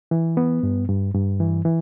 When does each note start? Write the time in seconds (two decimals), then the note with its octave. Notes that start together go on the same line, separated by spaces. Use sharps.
0.11 E3
0.37 B3
0.63 G2
0.89 G2
1.14 G2
1.40 E3
1.65 E3